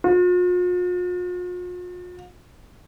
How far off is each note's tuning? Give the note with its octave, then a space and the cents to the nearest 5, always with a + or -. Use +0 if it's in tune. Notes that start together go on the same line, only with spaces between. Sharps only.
F4 +45